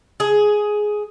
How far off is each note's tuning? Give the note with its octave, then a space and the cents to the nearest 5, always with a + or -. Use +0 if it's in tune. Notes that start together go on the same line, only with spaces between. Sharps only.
G#4 +10